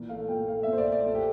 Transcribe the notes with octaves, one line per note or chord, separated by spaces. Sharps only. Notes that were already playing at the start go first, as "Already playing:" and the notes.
Already playing: A#2 E3
A3 F5
A#2 G5
A3 F5
E5
A#2
C5
D5
A3
D5
A#2 A4
G4